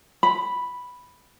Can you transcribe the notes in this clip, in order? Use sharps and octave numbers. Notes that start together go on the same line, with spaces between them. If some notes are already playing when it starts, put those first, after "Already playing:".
B5